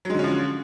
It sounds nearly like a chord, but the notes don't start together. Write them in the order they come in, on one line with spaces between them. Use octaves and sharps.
F#3 G#3 D3 C#4 F3